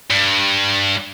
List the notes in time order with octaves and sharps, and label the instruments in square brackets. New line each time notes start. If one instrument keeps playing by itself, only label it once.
[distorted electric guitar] G2